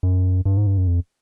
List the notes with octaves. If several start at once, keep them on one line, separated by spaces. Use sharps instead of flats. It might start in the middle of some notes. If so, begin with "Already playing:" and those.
F#2
G2
G#2
G2
F#2
F2